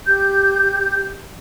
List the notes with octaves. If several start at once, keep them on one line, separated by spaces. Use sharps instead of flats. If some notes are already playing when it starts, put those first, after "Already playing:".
G4 G6